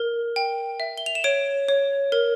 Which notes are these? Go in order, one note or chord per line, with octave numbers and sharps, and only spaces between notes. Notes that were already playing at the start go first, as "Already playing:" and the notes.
Already playing: A#4
G5
E5
G7
F7
E7
C#5 D7
C#5
A#4